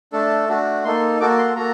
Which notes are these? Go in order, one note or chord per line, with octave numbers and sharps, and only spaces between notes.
A3 D4 A4
A3 D4 F#4
A#3 D#4 A4 C6
A#3 F#4 A4 D6
C6
A#3 F#4 A4 A#5